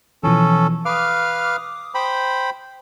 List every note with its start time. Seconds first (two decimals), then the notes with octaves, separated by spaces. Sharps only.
0.23 B2 E3 F3 C#4 A4
0.85 B4 F5 D6 D#6 F6
1.95 C5 G5 B5